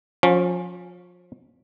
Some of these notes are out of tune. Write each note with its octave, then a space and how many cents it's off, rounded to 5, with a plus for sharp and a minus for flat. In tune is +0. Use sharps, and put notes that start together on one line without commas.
F3 +30 C#4 +0